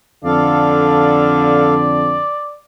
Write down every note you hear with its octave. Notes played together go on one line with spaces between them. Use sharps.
F2 D3 A4 D5 F5